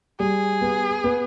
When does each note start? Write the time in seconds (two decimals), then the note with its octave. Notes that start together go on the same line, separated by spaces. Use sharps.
0.19 G3 G#4
0.62 B3
1.04 B3